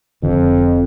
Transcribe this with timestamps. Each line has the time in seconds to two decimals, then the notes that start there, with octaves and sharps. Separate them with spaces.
0.23 F1 F2 D3